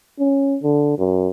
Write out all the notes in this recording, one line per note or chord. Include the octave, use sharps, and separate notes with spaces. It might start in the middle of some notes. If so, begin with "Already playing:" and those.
C#4
D3
F#2